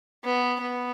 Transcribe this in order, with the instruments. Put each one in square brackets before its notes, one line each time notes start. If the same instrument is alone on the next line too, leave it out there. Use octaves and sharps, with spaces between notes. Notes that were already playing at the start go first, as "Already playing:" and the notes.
[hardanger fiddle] B3
B3